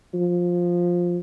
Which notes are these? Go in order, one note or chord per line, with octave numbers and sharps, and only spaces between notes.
F3